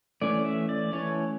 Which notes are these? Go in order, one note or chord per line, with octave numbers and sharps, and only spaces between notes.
E3 A3 C#4 D5
E5
D5
E3 A3 C#4 C#5